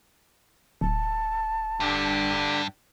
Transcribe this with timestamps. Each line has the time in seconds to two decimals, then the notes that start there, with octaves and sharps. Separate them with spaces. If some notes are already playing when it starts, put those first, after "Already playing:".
0.81 D1 A5
1.80 G2 D3 G4